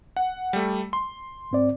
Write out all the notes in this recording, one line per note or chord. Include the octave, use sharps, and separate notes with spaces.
F#5
G3 A3
C6
G#2 C4 D5